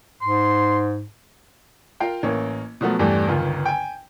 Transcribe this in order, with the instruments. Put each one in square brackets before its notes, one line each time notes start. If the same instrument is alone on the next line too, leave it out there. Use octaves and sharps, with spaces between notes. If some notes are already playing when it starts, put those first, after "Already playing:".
[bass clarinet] G#2 [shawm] C6
[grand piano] F4 A#4 F5 G5
A1 A#3 C#4
B2 F3 F#3 A3 B3
E2 G2 E3 G3 A3
G1 C#2 D#3 F4
G5 G#5